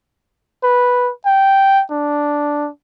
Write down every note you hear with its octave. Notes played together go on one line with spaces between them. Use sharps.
B4
G5
D4